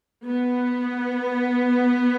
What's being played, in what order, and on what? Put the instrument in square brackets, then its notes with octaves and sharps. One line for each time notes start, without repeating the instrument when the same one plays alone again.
[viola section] B3